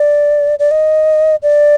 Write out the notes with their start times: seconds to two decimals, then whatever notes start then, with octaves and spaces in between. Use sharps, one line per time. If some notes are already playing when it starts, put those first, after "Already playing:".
Already playing: D5
0.59 D5
0.71 D#5
1.43 D5